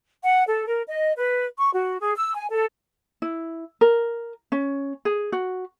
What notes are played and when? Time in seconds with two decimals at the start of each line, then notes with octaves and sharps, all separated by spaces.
0.24 F#5
0.47 A4
0.68 A#4
0.88 D#5
1.16 B4
1.57 C#6
1.73 F#4
1.99 G#4
2.16 E6
2.35 G#5
2.51 A4
3.22 E4
3.81 A#4
4.52 C#4
5.05 G#4
5.32 F#4